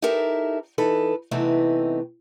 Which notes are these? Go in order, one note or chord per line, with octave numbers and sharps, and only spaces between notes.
D#4 E4 G4 A4 A#4 E5
E3 D#4 A4 B4
C3 E3 A3 B3 C4 D#4